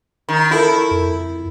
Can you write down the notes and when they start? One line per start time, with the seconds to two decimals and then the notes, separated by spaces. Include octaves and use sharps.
0.29 D#3
0.51 E4 F4 A4 A#4
0.91 F2